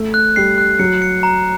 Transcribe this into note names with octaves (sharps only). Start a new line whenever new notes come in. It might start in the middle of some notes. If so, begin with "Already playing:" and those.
Already playing: A3
F#6
G3 C7
F#6
F#3 C#7
C#7
A#5